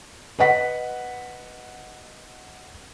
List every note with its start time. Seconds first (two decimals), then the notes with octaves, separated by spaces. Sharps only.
0.39 B4 D#5 F#5 B6